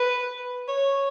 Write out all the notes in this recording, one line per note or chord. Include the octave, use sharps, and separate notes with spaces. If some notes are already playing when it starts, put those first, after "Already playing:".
Already playing: B4
C#5